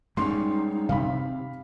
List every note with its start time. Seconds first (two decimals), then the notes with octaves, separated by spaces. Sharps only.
0.17 G3 G#3 C#4 D#4 C6
0.89 C3 F5 B5